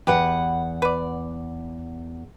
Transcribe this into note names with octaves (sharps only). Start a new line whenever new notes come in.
E2 G4 B4 F#5
B4 D5